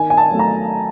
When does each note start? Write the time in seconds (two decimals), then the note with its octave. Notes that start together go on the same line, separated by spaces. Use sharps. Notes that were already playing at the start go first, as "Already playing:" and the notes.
Already playing: D#3 G#5
0.10 G#5
0.17 A5
0.31 F#3 A3
0.39 A#5